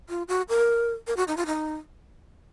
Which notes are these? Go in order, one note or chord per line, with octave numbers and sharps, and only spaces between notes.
F4
F#4
A#4
A#4
F#4
D#4
F4
D#4